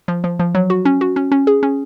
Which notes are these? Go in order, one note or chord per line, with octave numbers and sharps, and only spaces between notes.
F3
F3
F3
F#3
F#4
C#4
F#4
C#4
C#4
G#4
C#4